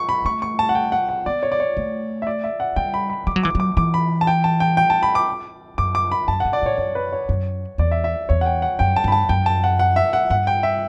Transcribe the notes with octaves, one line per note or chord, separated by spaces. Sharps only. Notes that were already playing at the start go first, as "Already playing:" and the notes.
Already playing: C#6
B5
A3 C#6
C#6
A5
F#5
G5
F#5
F#5
B3 D5
C#5
D5
C#5
A3
E5
D5
E5
F#5
G3 G5
B5
B5
G3 D6
F#3
E3 D6
F#3 D6
E3 D6
B5
A5
G5
A5
G5
G5
A5
B5
D6
F#2 D6
D6
B5
F#2 A5
G2 F#5
D5
A2 C#5
F#2 C#5
B4
C#5
F#2
E2 D5
E5
E5
E2 C#5
F#5
G5
F#5
F#2 G5
A5
G2 B5
A5
F#2 G5
A5
F#5
F#5
E5
F#5
G2 F#5
G5
E5